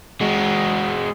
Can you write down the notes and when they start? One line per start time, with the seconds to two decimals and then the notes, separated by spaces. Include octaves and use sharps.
0.21 G#3 F#4